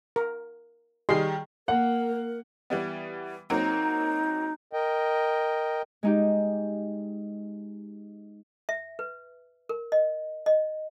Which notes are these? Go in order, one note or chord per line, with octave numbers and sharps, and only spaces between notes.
A#4
D#3 G3 G#4 D#5 C6
A#3 A#4 F#5
E3 G3 B3
F#3 A#3 C4 D#4
A#4 D#5 G5
G#3 D#4 G4
E5
B4
A#4
D#5
D#5